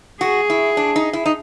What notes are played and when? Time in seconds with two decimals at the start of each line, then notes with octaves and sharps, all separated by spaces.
0.21 F#4 G#4
0.50 E4
0.77 D4
0.96 D#4
1.13 E4
1.26 D#4